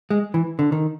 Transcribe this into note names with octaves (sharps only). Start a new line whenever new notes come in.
G#3
E3
D3
D#3